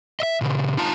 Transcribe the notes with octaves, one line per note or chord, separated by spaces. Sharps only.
D#5 E5
A#2 C#3
D#4 F4 A5 A#5